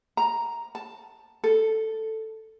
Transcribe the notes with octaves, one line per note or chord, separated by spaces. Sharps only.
A#5
A5
A4